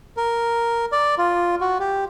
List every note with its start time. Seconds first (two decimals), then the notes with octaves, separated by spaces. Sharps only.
0.17 A#4
0.92 D5
1.18 F4
1.61 F#4
1.80 G4